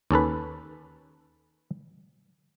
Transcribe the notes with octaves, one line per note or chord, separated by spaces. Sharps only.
D#2 C#4 A4 B4